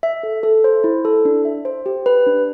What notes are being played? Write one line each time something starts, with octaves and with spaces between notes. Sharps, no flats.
E5
A4
A4
C5
E4
A4
D4
E5
C5
G4
B4
D4